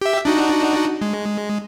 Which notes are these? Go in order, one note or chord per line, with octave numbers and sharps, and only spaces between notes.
G4 E5
D4 D#4 F#4
G#3